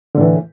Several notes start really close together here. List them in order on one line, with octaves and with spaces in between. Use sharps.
D3 A2 E3